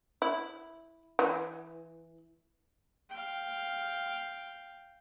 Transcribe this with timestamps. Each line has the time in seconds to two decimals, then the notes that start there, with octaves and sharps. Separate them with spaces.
0.22 E4
1.19 E3
3.10 F5 G5